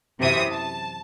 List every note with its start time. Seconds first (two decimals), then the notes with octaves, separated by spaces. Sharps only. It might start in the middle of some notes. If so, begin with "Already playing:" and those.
0.19 F#2 C3 E3 E5 D#6
0.51 A5